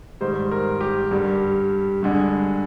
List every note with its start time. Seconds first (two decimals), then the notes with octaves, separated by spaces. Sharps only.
0.21 G#2 D#3 G3 C5
0.51 A#4
0.81 G4
1.11 G2 D3 G3
2.03 G2 D3 G#3